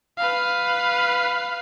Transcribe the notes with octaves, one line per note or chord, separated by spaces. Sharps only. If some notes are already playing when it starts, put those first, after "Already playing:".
B4 F5